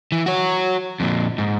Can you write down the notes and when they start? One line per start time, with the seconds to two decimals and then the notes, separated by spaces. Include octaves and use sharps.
0.12 E3
0.26 F#4 C#5
1.00 F2 A#2
1.38 G#2